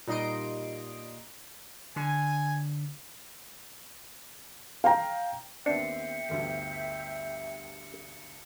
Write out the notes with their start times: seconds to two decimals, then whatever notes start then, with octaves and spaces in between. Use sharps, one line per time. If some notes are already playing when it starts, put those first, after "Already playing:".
0.07 A#2 G3 D#4 D#5 C6 D7
1.96 D3 G#5
4.84 F5 G5 A#5
5.66 D#2 B3 C4 D4 E5 G5 C7 C#7
6.29 G1 D2 G2 C#7